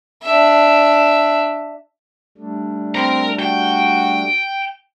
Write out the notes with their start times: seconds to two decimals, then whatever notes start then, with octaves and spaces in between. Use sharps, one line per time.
0.23 D4 E5
2.37 G3 A3 D4
2.95 C4 A#4 A#5
3.39 F#4 G5